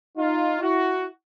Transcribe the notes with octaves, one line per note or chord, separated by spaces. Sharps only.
D#4 F4
E4 F#4